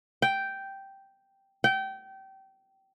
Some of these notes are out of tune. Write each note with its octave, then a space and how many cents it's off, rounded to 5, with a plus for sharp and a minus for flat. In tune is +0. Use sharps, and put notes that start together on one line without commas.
G5 -5
G5 -25